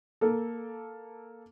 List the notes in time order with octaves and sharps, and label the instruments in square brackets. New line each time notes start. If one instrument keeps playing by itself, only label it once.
[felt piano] A#3 A4